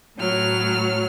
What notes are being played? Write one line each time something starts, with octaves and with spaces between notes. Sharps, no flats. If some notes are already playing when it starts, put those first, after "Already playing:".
A2 F#3 F6